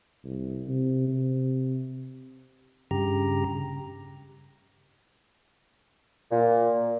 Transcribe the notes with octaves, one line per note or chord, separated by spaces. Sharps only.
C2
C3
C3
G2 C#3 G4 A#5
A#2